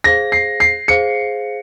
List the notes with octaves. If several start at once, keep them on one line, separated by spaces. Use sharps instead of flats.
G#4 C5 F5 A#6
C7
C7
G#4 C5 F5 C#7